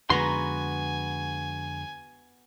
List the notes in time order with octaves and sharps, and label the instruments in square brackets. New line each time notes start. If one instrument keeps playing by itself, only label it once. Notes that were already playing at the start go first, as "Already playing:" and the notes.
[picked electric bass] F2 D3 G#3 [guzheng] B3 F#4 A#5 [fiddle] G#5 [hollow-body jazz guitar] C6